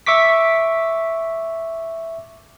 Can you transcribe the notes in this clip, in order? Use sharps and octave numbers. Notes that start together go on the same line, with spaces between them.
E5 C#6 D6 B6